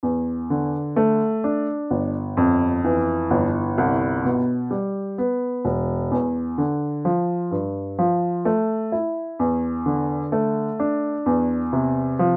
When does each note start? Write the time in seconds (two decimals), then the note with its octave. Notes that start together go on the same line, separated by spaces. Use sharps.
0.03 E2
0.50 D3
0.96 A3
1.44 D4
1.91 G1
2.37 F2
2.85 E3
3.31 G1
3.78 C2
4.25 B2
4.71 G3
5.18 B3
5.65 E1
6.11 E2
6.58 D3
7.05 F3
7.51 G2
7.99 F3
8.45 A3
8.92 E4
9.39 E2
9.86 D3
10.32 A3
10.80 D4
11.26 E2
11.73 C3
12.19 F3